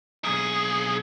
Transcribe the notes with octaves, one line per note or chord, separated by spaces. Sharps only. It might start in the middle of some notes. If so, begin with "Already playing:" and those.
B1 G#4